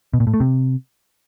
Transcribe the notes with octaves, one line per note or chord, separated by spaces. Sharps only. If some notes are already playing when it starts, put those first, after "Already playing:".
B2
A#2
A2
A3
C3